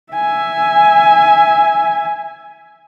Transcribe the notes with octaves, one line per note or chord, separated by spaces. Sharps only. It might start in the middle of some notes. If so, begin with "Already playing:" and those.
E5 G#5